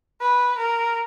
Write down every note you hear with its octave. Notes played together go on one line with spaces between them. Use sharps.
B4
A#4